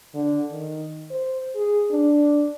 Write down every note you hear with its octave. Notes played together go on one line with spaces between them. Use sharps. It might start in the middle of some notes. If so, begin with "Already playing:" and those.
D3
D#3
C5
G#4
D4